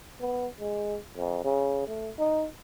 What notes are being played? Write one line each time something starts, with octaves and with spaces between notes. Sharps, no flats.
B3
G#3
F2
C#3
A3
D#4